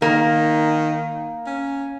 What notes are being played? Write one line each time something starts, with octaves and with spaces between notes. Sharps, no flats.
D#3 A#3
C#4